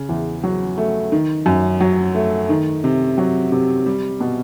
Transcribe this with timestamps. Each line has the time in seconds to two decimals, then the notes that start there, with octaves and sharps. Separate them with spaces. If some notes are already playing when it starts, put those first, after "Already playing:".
Already playing: C#3
0.09 E2
0.43 F#3
0.78 A3
1.12 D#3
1.46 F#2
1.81 F#3
2.15 A3
2.49 D#3
2.84 C3
3.18 F#3
3.52 C3
3.86 G3
4.21 B2